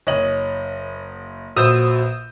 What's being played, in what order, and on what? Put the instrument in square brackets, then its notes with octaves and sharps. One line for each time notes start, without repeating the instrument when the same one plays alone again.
[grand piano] F#1 F#7 [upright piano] C#5 D#5
[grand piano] A#1 G6 [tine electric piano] F#4 B4 C5 [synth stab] D#6 E6